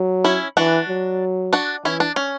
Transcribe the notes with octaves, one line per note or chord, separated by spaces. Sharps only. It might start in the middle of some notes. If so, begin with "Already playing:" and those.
Already playing: F#3
C#4 E4
E3 D4 F#4
F#3
D4 F#4
E3 C#4 E4
D4
C#4